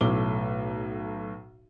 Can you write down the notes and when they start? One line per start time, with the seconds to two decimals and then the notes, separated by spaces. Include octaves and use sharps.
0.01 B1 A2 A3 A4 D6 G7